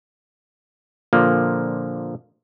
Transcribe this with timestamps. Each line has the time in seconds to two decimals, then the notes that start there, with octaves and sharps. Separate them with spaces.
1.13 A#2 D3 F3 A#3